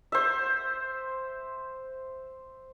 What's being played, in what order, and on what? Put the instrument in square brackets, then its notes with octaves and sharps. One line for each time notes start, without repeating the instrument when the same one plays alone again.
[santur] C5 E5